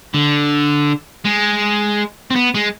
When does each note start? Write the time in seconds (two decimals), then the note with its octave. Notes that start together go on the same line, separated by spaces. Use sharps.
0.14 D3
1.25 G#3
2.31 C4
2.36 B3
2.54 G#3